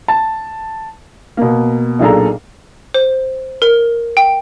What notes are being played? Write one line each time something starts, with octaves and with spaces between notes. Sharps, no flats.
A5
B2 A#3
B1 A#2 D4 G#4 A4 A#5
C5
A#4
G5